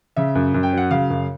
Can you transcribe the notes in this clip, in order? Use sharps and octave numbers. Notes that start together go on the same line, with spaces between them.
C#3 E5
F#2
F#2
G5
F#3 F#5
C#3 F5
F#2